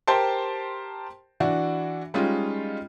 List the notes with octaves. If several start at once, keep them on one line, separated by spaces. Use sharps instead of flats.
G4 A#4 C5 G5 A5 C6
E3 D4 F#4
G3 G#3 C#4 D#4 F4